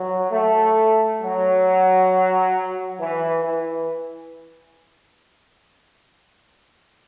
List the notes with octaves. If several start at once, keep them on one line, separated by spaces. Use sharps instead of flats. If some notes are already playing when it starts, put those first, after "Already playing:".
Already playing: F#3
A3
F#3
E3
E3